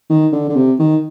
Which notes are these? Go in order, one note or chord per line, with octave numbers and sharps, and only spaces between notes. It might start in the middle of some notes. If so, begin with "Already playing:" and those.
D#3
D3
D3
C3
D#3